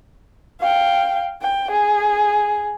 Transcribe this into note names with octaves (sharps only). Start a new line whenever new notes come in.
F5 G5
G5
G#4